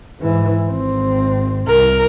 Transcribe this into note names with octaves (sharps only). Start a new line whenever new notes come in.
G#2 E3
G#1 C4
C2 A#4